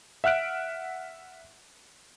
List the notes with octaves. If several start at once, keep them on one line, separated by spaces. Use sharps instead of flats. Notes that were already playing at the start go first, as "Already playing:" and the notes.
E5 F#5 F6 F#6 D7